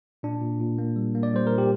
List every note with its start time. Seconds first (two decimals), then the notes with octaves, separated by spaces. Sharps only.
0.23 A#2 D4
0.41 A#2
0.60 A#2
0.78 A#3
0.96 G3
1.15 A#3
1.23 D5
1.34 G3 C5
1.47 A#2 A#4
1.58 G4